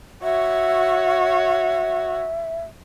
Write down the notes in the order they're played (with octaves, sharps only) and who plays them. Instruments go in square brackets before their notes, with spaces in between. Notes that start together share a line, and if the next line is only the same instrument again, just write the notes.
[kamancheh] F#4 C#5 [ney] E5